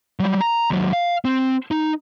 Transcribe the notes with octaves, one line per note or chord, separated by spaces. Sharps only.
F#3 G3
A#5
D#2 F#3
F5
C4
D#4